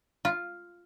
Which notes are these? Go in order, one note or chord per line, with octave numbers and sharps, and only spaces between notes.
F4